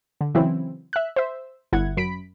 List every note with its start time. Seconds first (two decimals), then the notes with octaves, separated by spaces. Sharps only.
0.21 D3
0.35 C#3 E3 F#3 C4 E4
0.93 E5 F#6
1.16 C5 E5
1.72 G1 E4 F#5 G#6
1.97 F#2 B5 B6 D7